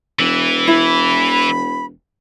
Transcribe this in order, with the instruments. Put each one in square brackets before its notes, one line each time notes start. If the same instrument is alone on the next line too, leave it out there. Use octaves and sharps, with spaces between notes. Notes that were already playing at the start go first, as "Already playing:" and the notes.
[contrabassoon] E1 [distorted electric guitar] E3
[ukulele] E4 [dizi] B5